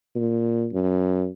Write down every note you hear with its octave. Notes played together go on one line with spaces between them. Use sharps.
A#2
F#2